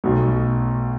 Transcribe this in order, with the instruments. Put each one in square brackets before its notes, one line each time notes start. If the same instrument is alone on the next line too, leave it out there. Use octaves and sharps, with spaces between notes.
[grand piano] B1 B2 A3